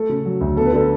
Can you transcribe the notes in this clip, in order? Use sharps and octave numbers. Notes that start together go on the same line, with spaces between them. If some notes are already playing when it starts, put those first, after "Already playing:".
Already playing: A3 A4
C#3
F#3
D2
B3 A4
B4
D3 A4